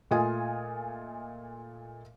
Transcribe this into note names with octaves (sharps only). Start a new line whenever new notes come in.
A#2 A3 F4 D#5 G#5 D#6